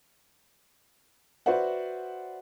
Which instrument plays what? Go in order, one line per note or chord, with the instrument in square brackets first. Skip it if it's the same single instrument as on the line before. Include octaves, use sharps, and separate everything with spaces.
[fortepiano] F#4 B4 C5 D5 E5 F#5